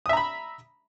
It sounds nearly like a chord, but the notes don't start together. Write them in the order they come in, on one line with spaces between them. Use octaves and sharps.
D#6 E5 A#5 B5